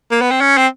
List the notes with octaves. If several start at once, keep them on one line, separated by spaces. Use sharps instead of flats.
A#3
B3
C4
C#4
C4